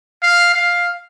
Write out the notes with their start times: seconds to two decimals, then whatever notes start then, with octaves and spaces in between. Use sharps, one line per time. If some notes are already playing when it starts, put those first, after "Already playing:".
0.23 F5
0.54 F5